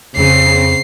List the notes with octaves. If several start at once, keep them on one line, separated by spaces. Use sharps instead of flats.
F2 C#3 C4 C7